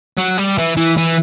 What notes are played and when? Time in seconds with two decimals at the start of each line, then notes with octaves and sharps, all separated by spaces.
0.18 F#3
0.38 G3
0.58 E3
0.76 E3
0.97 E3